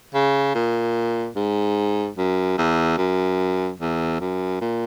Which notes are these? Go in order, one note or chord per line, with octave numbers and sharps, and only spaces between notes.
C#3
A#2
G#2
F#2
E2
F#2
E2
F#2
A#2